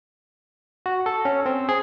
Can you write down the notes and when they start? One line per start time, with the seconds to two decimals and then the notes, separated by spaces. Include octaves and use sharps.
0.86 F#4
1.06 A4
1.25 C#4
1.46 C4
1.69 G#4